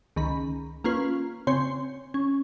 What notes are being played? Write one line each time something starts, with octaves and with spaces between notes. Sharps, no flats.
C#2 D#3 B5
A#3 C#4 F4 B4
C#3 C4 C#5 C6
C#4